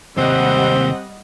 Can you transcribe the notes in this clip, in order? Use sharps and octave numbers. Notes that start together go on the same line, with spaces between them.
D#2 C3 G3 C4 D#5 F#5